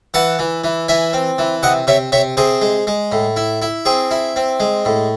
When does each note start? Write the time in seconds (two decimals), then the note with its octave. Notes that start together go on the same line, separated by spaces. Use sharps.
0.14 E3 F#5 A5
0.39 E3
0.64 E3
0.88 E3 E5 G#5
1.13 C4
1.38 E3
1.63 C3 D#5 F#5
1.87 C3 C#5 E5
2.12 C3 C#5 E5
2.37 C3 G#4 C5
2.62 G#3
2.87 G#3
3.12 A2
3.36 E4
3.62 E4
3.85 C4 G#4
4.11 E4
4.36 C4
4.60 G#3
4.85 A2